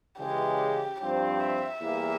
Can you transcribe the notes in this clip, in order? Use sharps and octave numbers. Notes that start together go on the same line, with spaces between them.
C#3 E3 G#3 G4
G2 F3 C4 G4
E5
E2 E3 G3 A#3